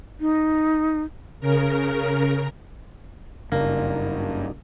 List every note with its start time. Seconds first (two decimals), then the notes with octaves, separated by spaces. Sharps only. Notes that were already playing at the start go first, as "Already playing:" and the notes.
0.20 D#4
1.40 C#3 A#4
3.52 F#1 G2 C#3 A#3 D4 D#4